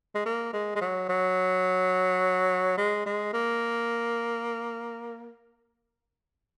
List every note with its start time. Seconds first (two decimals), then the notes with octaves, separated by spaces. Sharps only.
0.15 G#3
0.26 A#3
0.53 G#3
0.76 G#3
0.81 F#3
1.09 F#3
2.78 G#3
3.06 G#3
3.33 A#3